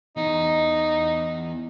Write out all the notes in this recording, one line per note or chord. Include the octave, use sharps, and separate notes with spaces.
E2 D#4